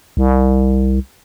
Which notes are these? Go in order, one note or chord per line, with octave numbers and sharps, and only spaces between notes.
C2